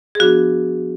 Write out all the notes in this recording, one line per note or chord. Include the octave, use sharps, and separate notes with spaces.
G#4
F3 B3 D4 F#4